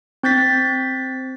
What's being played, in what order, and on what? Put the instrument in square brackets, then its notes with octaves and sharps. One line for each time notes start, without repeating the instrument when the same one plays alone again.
[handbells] C4 G6 A6 B6